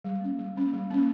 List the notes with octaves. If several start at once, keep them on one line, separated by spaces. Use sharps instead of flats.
G3
A#3 C#4
G3
A#3 C#4
G3
A#3 C#4